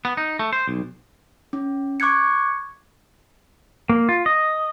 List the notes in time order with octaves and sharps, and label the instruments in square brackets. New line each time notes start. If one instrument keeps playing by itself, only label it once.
[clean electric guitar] B3
D#4
A3
C5
B1
[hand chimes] C#4
C#6 D6 F#6 G#6 C#7
[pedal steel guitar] A#3
F4
D#5